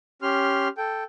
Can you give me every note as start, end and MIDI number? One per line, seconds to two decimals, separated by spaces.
0.22 0.68 61
0.22 0.68 67
0.22 0.68 84
0.22 0.68 89
0.77 1.04 69
0.77 1.04 79